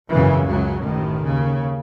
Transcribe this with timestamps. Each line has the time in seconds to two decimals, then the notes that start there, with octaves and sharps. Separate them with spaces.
0.10 G#1 F#2 C#3 E3
0.47 C#2 C#3 F#3
0.84 A1 A2 D#3
1.23 D#2 C#3